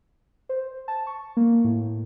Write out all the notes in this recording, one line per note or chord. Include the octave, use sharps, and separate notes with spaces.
C5
A5
C#6
A#3
A2